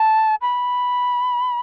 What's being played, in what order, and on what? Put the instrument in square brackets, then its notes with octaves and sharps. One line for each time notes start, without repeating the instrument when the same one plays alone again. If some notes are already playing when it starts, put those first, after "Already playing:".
Already playing: [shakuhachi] A5
B5